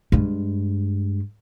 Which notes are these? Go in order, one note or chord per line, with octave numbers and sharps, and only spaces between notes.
G2 G#3